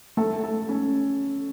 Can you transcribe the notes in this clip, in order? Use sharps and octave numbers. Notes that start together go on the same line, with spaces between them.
A3 A4
A4
C#4